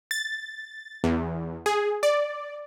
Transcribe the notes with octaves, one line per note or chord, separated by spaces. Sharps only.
A6
E2
G#4
D5